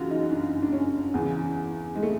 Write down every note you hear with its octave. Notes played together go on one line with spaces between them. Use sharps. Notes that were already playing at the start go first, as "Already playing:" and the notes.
Already playing: F#2 C#3 E3 F4 F#4
D#4
D4
D4
C#4
E2 C#3 E3
G#3
A3